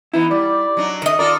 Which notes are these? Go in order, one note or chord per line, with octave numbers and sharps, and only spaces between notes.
E3 B3 D#4 E4
G3 D5
F#3 D4 D#4
D#3 D#5
F4 A4 A#4 D5